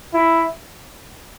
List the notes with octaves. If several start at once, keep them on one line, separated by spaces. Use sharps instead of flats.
E4